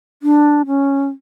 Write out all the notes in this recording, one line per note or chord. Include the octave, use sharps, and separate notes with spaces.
D4
C#4